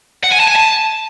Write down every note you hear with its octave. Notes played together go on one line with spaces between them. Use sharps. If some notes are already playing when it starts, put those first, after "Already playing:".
F#5
G#5
A5
G#5
A5